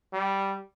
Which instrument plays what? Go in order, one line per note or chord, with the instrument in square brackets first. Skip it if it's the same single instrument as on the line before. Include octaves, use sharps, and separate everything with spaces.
[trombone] G3